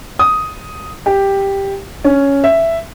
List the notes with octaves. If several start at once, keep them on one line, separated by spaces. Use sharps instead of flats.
D#6
G4
C#4
E5